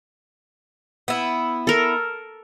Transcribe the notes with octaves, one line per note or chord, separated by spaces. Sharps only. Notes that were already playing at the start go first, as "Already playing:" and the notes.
B3 E4
A4 A#4